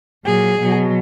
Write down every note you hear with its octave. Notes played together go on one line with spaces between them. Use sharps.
A#2 F#3 G#4
B2 F#3